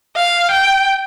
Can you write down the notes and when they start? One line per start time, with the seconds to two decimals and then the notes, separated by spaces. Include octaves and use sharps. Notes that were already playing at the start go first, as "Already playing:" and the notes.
0.16 F5
0.51 G5